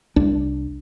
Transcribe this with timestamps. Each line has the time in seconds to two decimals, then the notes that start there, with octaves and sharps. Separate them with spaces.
0.16 C2 D4